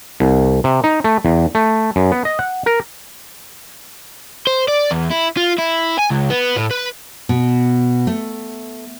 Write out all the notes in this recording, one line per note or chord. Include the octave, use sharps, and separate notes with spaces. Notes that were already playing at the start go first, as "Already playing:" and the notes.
C2
C3
D#4
A3
E2
A3
F#2
B3
D#5
F#5
A#4
C5
D5
E2
E4
F4
E4
G#5
C#2
B3
A2
B4
B2
A3